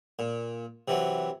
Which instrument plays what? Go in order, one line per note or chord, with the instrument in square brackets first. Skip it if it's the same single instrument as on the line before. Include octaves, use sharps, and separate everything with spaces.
[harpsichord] A#2
C3 E3 F#3